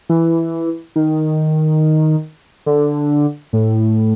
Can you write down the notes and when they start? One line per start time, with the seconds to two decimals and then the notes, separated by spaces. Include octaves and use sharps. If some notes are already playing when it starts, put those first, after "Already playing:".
0.09 E3
0.96 D#3
2.66 D3
3.53 A2